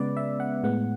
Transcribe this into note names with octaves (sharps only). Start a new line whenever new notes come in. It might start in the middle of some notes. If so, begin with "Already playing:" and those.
Already playing: C#3 G#3 B3 B4 D5
E5
F#5
A2 G#3 B3 F#5